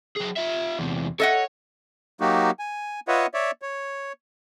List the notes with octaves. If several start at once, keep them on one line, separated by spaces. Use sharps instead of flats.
F#3 G#4
F4 E5
E2 C3
A4 C#5 D#5 F#5
F#3 A#3 D#4 F#4 G4
G#5
F4 B4 C#5 D#5 E5 F#5
C#5 D5 E5
C#5